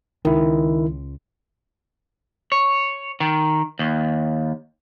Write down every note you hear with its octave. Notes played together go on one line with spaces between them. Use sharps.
C#2 D#3 E4
C#5
D#3
D#2